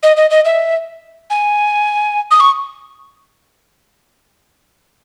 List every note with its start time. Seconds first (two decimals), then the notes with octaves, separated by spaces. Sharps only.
0.03 D#5
0.17 D#5
0.30 D#5
0.45 E5
1.30 G#5
2.31 D#6
2.40 C#6